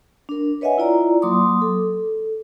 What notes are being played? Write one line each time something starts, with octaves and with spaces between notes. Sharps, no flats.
D4 A#4
B4 C#5 D#5 E5 F#5 G#5
E4 F4 D5 A#5
F#3 A#3 C6 D6 D#6
A4